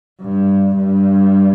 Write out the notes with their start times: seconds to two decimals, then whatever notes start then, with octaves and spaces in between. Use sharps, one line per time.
0.21 G2
0.77 G2